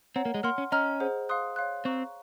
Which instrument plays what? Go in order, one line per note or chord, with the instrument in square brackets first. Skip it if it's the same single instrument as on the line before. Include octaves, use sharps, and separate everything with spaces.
[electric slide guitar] C4 [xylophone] C#5 F#5 A#5
[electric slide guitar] A#3
G#3
[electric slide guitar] A#3 [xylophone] F#5 C6 F6
[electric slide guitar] C#4
[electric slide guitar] C#4 [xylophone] D#5 A#5 F6
[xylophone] G#4 C5 F#5
F5 C6 D#6 F#6
C#5 F5 C6 F#6
[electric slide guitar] C4 [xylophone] F5 A#5 C#6 F#6